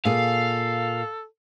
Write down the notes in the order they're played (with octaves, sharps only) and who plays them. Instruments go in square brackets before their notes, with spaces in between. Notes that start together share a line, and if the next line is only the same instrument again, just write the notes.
[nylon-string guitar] A#2 G#4 [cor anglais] A4 [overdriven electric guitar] F5